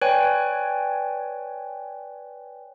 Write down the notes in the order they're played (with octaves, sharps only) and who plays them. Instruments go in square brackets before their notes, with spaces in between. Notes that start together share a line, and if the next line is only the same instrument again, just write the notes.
[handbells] B4 C#5 D5 G5 G#5